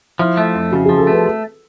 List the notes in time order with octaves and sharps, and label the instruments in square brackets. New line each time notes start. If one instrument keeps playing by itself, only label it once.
[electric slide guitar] F3 [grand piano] E4
[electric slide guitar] A3
F2
[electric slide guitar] C#3 [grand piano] F#4
[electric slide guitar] F3 [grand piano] G#4
[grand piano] A4
[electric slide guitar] A3 [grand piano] B4